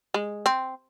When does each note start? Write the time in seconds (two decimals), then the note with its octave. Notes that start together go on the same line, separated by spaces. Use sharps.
0.14 G#3
0.46 C4